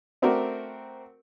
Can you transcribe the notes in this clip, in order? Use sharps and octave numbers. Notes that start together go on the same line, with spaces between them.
A3 C4 F#4 A#4 D5